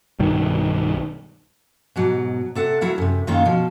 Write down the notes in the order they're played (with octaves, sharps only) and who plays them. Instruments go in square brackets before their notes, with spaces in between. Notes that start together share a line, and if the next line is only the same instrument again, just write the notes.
[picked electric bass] B1 G2 D#3
[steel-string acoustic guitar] G#2 B2 F#3
C3 A4 F#5
F#3 E4 A#4 F#5
F#2 C3
F#2 D#3 G#3 A#3 C#4 F4
B2 F3